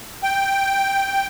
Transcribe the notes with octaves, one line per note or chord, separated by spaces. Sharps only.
G5